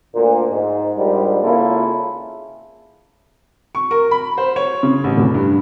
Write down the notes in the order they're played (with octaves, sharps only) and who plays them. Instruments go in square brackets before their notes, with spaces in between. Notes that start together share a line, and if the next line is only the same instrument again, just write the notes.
[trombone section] D2 A#2
G#2
A#1 G#2 G3
G#1 C#3 A#3 E4 F4 A4
[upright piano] C#6
A#4
B5
C5
C#5
C#3
A1
F1
G2